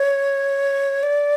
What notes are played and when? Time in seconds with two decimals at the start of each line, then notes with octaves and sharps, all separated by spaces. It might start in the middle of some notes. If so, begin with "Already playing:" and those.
Already playing: C#5
1.03 D5